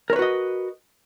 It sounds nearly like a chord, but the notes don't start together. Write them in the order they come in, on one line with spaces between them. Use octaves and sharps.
A#4 C#5 B4 F#4 D#5